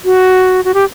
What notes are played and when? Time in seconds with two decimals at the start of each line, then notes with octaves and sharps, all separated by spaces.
0.05 F#4
0.65 F#4
0.74 G4